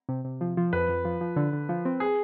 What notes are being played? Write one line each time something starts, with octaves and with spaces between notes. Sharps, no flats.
C3
C3
F3
F3
F2 B4
F2
F3
F3
D3
D3
F3
C4
G#4